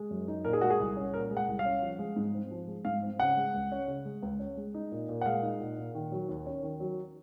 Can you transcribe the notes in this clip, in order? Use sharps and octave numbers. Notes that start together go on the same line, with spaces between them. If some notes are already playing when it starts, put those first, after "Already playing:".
Already playing: G#3
F#2
D#4
A#2 A#4
G#4
G#3 F#4
G#4
C2
C#4
A#2 A#4
G#3
F#5
C2
F5
C#4
F3
G#3
G#2
C4
F3
G#3
G#2 F5
C4
C#3 F#5
G#3
C#2
C#4
C#3
G#3
C#2
C#4
G#3
D#4
A#2
A#2
F#5
G#3 F5
D#4
A#2
A#2
D#3
F#3
D#2
C#4
D#3
F#3